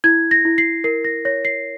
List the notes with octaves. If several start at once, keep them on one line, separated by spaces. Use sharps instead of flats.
E4 G#6
A#6
E4
C7
A#4 C7
A#6
C#5 A#6
C7